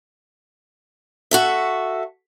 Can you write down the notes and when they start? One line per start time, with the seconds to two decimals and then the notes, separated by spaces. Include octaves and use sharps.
1.31 F#4 A4 E5